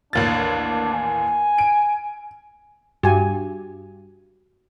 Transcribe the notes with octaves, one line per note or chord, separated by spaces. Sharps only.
A1 D#2 D4 A6
G#5
D7
G2 F#4 G4 G#5